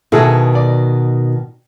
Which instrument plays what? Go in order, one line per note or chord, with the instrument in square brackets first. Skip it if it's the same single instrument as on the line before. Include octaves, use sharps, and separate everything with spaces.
[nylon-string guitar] B2 D#3 [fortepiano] E4 G#4 A4
[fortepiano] D5